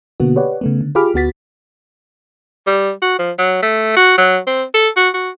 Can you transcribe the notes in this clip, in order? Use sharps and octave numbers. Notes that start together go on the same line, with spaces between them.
B2 D3 A#3 B3 F#4
G4 B4 C#5 D5 F#5
C#3 A3 B3
D3
F4 G4 G#4 B5 D6 F6
D2 B3 F#4 A6 B6
G3
F#4
F3
F#3
A3
F#4
F#3
C4
A4
F#4
F#4